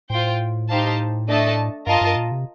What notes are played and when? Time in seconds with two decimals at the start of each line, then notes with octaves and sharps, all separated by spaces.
0.10 A2 F4 C5 G5
0.69 D#4 G4 C5 F5 A5
1.28 A3 D4 A4 D#5 A5
1.87 G2 F4 A#4 D#5 A5
2.01 G2
2.16 A#2
2.31 C3